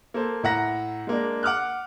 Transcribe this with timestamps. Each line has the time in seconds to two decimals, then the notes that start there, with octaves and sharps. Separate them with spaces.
0.14 A#3 A4 C5
0.43 A2 E5 F#5 A#5 A#6
1.07 G#3 A#3 D4
1.43 F#5 D6 F6 F#6